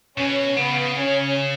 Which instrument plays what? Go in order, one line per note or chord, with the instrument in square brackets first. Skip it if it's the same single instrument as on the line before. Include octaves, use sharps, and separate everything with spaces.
[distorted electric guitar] B2 [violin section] C#4
[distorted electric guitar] C#3 [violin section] B3
[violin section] C#4